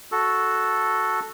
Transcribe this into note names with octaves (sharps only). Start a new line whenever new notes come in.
F#4 A4